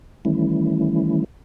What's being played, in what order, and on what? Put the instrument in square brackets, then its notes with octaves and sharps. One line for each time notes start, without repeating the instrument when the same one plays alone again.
[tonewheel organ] D#3 E3 G3 A3 C#4 E4